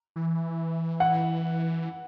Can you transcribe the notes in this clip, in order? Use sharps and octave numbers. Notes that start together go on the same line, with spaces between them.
E3
F#5